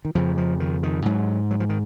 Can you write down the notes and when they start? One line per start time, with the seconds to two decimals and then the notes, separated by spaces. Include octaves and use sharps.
0.05 D#3
0.15 F2 C#3 F3
0.37 F3
0.60 D#3
0.83 D#3
1.06 G#2 F#3
1.51 F#3
1.60 F3
1.69 D#3